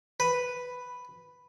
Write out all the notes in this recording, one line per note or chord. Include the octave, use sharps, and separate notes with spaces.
B4